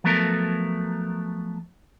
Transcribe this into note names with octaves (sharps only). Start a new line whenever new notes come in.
F3 F#3 A3 B3 A4 A#4